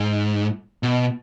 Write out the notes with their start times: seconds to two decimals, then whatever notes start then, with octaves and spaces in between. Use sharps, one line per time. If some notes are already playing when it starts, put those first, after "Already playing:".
Already playing: G#2
0.83 B2